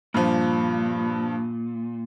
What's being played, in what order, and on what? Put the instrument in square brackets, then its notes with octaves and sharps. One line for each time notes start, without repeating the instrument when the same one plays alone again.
[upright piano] G2 F3 [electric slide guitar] A#2